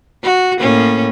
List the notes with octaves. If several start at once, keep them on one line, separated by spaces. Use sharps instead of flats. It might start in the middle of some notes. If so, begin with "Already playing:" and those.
F#4
A2 A#3 C#4